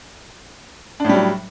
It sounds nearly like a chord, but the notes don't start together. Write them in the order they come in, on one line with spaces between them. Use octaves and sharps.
D4 A2 G3 F#3